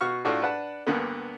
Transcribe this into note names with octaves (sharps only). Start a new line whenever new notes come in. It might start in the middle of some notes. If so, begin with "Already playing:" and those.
B2 F#4 C#6 F6
A2 D4 F4 F#4 A4
D4 B4 F#5 A5
D2 G2 D3 A#3 B3